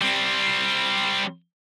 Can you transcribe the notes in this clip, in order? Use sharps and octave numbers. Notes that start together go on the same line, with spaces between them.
G3 C4